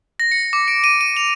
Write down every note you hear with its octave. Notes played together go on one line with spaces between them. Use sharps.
A#6
C#7
D6
D7
D#7
D#7
F7